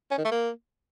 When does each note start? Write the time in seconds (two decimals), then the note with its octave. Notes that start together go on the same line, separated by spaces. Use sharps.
0.11 C#4
0.18 D#3
0.25 A3
0.32 A#3